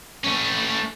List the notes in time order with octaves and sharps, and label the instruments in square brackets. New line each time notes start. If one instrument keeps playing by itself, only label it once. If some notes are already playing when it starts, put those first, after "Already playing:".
[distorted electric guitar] A3 C#4